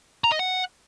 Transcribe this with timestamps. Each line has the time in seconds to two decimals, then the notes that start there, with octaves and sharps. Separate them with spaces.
0.24 A#5
0.32 D#5
0.39 F#5